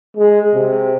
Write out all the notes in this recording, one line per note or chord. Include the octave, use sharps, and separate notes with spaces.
G#3
C3